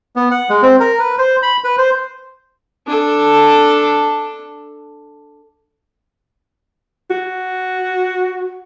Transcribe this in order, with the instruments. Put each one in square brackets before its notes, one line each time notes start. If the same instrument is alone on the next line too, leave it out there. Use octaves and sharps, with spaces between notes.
[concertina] B3
F#5
G#3
C4
A#4
B4
C5
B5
B4
C5
[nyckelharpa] D4 A4
[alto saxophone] F#4